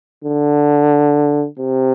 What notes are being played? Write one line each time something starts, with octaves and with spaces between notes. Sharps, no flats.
D3
C3